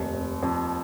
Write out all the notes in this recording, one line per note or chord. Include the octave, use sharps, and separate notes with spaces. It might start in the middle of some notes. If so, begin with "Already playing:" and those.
Already playing: F1 D#2
F1
F2